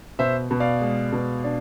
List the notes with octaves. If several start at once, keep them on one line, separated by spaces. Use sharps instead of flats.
B2 C5 E5
B2
D5 F5
G#3
B2
D4